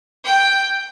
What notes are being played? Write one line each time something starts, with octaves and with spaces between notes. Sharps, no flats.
G5